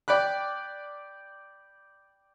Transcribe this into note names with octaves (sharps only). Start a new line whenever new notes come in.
D5 G5 B5 F#6